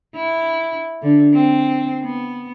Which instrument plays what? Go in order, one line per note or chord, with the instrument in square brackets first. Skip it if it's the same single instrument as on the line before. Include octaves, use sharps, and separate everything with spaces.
[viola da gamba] E4
D3
C4
B3